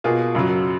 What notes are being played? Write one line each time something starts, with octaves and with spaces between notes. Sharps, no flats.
B2 A#3 F4 G#4
F#2 C#3 F#3